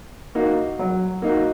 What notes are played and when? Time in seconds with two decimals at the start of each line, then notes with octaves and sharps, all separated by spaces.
0.35 A#3 D#4 F#4
0.79 F#3
1.22 A#3 D#4 F#4